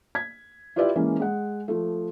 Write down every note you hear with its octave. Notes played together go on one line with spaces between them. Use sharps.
G#6 B6
E4 F4 G4 B4 D5 E5
E3 G#3 A#3 C#4
G#3 F#5
F3 A3